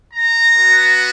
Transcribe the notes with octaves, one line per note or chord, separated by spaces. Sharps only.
A#5
B3 F#4